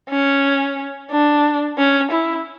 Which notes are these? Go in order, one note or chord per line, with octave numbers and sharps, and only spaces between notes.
C#4
D4
C#4
E4